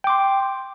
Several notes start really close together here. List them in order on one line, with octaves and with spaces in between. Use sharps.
G5 D6 C6